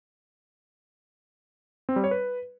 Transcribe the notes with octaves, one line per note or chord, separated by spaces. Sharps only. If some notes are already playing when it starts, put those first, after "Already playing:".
C4
G3
C#5
B4